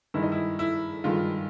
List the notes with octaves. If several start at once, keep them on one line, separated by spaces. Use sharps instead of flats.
G2 D#3 G#3 E4
D#4
E4
E4
G2 D#3 G#3 F4